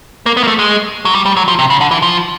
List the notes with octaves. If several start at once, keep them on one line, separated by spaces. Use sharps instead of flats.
A#3
B3
A#3
A3
G#3
F#3
G3
G3
F#3
F3
C3
C#3
D3
E3
F3